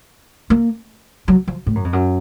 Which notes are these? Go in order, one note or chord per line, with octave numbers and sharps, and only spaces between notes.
A#3
F#3
F3
A2
F#2
F2
F#2